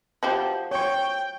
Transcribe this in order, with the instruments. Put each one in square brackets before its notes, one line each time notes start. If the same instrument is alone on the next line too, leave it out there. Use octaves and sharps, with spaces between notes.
[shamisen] F3 F#4 G4
[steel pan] C#5 C#6 [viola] G5